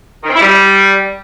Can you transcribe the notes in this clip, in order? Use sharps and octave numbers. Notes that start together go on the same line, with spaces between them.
D#3
C4
E4
G3